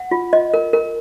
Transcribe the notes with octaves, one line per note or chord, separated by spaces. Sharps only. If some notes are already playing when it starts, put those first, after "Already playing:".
Already playing: F#5
F4
D#5
A#4
A#4